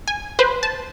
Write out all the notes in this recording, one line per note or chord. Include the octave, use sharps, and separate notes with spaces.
G#5
B4 C5
A5